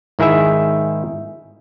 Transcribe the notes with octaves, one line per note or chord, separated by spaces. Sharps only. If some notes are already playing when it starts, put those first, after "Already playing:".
G#2 D#3 E4 G#4 E5